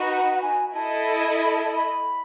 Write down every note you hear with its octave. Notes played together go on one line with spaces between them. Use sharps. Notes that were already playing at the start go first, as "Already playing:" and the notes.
Already playing: D#4 F#4 B4
F#5
F#5
G#5
E4 A4 D#5 A5
B5
A5
A5
B5